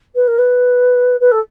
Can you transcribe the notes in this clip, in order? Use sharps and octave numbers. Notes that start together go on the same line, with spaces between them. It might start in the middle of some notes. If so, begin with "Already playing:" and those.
B4
A#4
B4
B4
A4